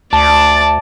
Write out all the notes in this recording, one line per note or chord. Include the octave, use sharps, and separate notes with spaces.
D2 D5 A5